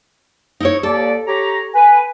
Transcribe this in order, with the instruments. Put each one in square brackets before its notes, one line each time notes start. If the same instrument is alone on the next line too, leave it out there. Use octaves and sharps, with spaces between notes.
[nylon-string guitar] D#4 E4 C#5
[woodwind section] D#2 D5 [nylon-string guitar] A4
[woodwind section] G4 C#5 A#5
[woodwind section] B4 [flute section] G#5